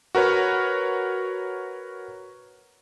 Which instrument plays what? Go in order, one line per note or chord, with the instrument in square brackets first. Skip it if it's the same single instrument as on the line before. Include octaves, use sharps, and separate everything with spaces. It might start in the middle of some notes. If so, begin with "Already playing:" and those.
[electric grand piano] F#4 A#4 B4 C#5